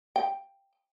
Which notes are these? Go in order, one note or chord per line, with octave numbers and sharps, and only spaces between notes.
G5